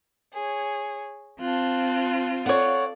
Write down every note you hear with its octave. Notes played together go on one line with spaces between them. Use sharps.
G#4 C#5
C4 F4 A5 F#6
A4 C#5 D5 F5 F#5